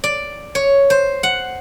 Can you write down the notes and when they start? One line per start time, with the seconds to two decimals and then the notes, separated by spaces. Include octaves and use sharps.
0.04 D5
0.55 C#5
0.90 C5
1.23 F#5